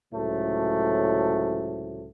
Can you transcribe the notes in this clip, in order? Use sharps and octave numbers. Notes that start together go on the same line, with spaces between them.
C#2 A2 C3 F#3 A3